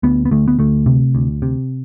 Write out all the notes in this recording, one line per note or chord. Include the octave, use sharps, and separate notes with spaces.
D2 B3
B3
D2 A3
B3
D2 A3
C3
D2
C3